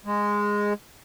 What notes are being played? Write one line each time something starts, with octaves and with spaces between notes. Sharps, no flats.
G#3